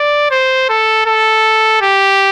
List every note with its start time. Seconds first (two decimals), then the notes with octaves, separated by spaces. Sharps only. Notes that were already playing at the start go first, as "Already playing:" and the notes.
Already playing: D5
0.31 C5
0.69 A4
1.06 A4
1.82 G4